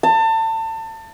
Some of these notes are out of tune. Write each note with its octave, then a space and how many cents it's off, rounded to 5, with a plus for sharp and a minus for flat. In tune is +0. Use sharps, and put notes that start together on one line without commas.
A5 +30